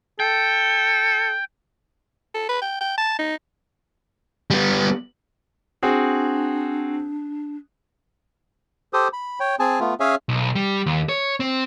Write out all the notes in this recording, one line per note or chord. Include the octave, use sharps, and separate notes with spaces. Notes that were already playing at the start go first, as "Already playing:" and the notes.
A4 G5
A4
B4
G5
G5
A5
D#4
G3 B3
C4 D4 F#4 G#4
G4 A4 C5 D#6
B5
C#5 G5
C4 G#4 G#5 A5
A3 B3 F4
C#4 G#4 C#5 E5 F5 G#5
B1
G3
D#2
C#5
C4